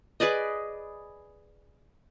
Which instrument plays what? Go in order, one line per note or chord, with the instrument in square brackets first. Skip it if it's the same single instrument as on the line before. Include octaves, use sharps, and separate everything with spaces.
[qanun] G#4 B4 D5 D#5